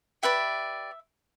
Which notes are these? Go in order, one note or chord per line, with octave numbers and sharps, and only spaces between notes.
G4 B4 D5 E5